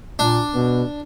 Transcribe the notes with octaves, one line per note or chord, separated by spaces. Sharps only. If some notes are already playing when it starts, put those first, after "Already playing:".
A#2 D4
B2 B3